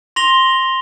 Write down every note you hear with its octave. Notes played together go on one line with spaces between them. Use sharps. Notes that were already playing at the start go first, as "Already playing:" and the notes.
C6 A#6 F7 G7